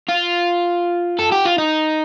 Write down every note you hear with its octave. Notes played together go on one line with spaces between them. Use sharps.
F4
A4
G4
F4
D#4